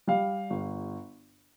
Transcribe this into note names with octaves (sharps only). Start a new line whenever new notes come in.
G3 F5
G1